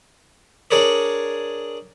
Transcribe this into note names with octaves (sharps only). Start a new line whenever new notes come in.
D4 G#4 A#4 C#5 D5